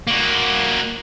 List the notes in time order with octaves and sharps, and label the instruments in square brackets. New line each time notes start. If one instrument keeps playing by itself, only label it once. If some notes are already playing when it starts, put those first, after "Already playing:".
[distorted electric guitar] A#3 F#4